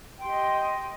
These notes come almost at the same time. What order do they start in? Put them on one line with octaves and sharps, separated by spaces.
G5 C6 G4 D#5